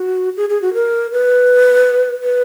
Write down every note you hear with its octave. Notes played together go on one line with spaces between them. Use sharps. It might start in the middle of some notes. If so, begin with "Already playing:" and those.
Already playing: F#4
G#4
G#4
F#4
A#4
B4
B4